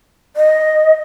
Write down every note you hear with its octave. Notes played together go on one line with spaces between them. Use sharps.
D#5